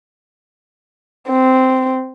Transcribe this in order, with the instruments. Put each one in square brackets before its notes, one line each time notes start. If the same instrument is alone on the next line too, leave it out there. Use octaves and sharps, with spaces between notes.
[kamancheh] C4